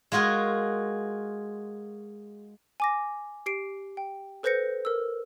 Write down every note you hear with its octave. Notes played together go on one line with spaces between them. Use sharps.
G#3 F4 F#4 G#4 A#4
G#5 D6 A#6
G4 C7 D7
G5
A4 B4 C5 G6 A#6 C#7
A#4 E6